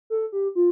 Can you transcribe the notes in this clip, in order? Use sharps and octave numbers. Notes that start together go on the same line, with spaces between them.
A4
G4
F4